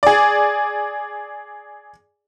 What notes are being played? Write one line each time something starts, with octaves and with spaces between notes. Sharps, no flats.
G#4 D5